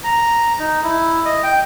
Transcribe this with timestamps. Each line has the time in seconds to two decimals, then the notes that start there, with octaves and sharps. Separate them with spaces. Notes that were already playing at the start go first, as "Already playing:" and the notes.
0.04 A#5
0.59 D#4
0.83 E4
1.25 D#5
1.43 G5